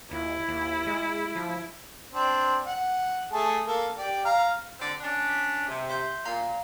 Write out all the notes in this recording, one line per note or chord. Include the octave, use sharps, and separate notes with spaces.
D#2 E4
D#2
G#3
F3
C4 D4
F#5
A3 G#4 A5
A#3 A4 A#4
G4 D5
F5 A#5 F6
D3 C4 D5
C#4 D4
B6
C3
E5 C6 G6
A#2 F5 A#5